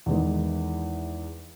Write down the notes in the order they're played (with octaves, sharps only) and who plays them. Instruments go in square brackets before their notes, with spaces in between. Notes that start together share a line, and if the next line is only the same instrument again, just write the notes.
[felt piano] E2 D#3 E3 G#3